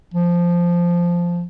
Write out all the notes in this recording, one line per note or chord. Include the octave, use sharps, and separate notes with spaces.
F3